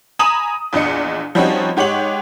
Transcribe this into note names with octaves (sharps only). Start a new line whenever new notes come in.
G#5 A#5 B5 D#6 E7 F#7
A#1 E2 D4 D#5 C#7
F3 G3 C4 C#4 D#4 F#4
G#2 G4 C#5 F#5 F#7